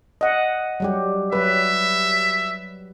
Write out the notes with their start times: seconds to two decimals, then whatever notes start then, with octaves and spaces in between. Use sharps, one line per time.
0.21 D#5 F#5
0.80 F#3 G3 G4
1.33 F#3 B4 E5